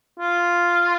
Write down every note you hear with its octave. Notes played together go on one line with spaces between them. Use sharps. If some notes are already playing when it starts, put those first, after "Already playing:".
F4